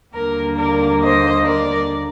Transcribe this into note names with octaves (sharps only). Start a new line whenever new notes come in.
D#2 D3 G3 A#3 A#4
A#4 D5
C5 D#5
A#4 D5